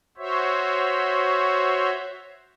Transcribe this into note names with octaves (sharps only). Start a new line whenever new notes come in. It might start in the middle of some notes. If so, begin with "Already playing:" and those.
F#4 C5 C#5 E5